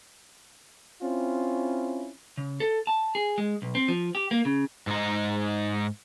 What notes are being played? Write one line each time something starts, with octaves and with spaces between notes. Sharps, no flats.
C4 C#4 E4 F4
C#3
A4
A5
G#4
G#3
B1
C4
F3
G4
A#3
C#3
G#2 D#4